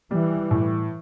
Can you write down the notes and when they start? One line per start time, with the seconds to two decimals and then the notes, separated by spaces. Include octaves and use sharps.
0.11 E3 G3
0.51 A2